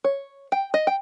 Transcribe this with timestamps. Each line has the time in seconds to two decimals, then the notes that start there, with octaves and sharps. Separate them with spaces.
0.04 C#5
0.52 G5
0.74 D#5
0.87 G5